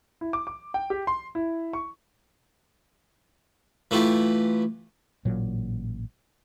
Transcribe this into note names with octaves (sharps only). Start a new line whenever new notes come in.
E4
D6
D6
G5
G4
C6
E4
C#6
E3 A3 F4 G4
A1 A#2 F#3